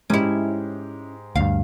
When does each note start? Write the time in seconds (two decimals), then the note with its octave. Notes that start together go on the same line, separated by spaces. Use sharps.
0.10 G#2 G#3 C#4 E4 G4
1.36 D2 G2 F5